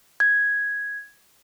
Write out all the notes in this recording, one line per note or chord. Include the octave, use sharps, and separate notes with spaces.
G#6